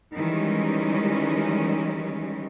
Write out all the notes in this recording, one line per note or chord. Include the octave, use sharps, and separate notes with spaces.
D#3 E3 G3 G#3 C#4